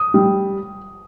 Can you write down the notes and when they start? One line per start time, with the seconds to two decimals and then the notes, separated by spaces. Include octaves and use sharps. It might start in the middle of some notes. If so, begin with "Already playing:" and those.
Already playing: D#6
0.14 G3